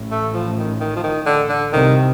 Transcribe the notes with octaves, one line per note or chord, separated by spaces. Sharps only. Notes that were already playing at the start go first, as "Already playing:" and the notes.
Already playing: A1 A2
A3
F3
D#3
D#3
F3
D#3
D3
D3
C2 C3 D#3